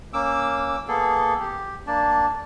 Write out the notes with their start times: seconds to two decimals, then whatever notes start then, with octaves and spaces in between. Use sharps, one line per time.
0.13 A#3 C#4 D6 E6
0.88 A#3 B3 G#4 A4
1.40 G4
1.87 A#3 D4 A5